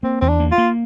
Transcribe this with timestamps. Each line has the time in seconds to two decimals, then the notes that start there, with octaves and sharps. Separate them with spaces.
0.03 A#3 C4
0.21 E2 C4
0.29 D4
0.40 A#3
0.52 F4
0.58 A#3